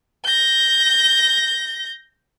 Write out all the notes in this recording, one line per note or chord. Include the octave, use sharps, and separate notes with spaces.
G6 A#6